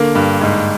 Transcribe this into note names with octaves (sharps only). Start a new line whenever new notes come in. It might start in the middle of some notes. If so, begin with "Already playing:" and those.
Already playing: D3 A#3
G2
G#2